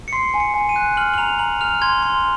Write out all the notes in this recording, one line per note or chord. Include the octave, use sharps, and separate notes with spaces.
C#7
C6 C7
G#5
C#7
G#5
D#7
F#6
F6 F#7
F#7
A#5 F7
A#5 F#7
F6 F7
C6 G#6
C6